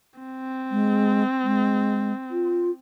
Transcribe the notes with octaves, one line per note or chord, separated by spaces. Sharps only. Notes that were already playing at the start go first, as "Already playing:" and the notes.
C4
G#3
G#3
F4